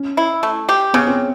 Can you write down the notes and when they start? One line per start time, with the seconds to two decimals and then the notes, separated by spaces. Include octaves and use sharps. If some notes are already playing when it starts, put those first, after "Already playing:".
Already playing: C#4
0.17 E4
0.43 A3
0.69 G4
0.93 C#3 B3
1.07 C4